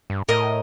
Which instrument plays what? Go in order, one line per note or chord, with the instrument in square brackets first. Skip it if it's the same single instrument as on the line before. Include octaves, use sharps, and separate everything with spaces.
[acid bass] G2
[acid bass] A2 [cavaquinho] A#4 D#5 A#5 D#6